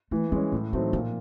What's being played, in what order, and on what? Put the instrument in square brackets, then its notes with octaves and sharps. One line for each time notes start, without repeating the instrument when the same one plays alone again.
[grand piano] E3 [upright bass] A3
[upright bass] G3 [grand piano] G#3 C#4
[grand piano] A2 [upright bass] F#3
[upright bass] E3 [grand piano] F#3 A3 C4 D#4
[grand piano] A#2 [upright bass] F3